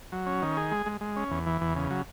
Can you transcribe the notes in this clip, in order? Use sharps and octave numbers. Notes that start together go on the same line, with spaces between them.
F#3
C#4
D#3
G#4
G#3
G#3
G#3
C#4
E2
E3
E2
C#3
F#3